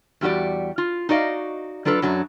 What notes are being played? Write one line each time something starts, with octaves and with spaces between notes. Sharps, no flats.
E2 G3 F#4 G4 D5
F4
D#4 F#4 D5 D#5 F5
F#3 D4 F4 A4 B4
F#2 F#3 D4